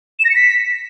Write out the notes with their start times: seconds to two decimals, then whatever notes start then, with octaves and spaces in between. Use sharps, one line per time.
0.19 E7
0.25 A#6
0.30 C#7
0.35 B6